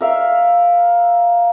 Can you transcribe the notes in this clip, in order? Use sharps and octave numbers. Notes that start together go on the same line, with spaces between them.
A#4 E5 F5